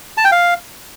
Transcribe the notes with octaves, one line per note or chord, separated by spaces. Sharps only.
A5
G5
F5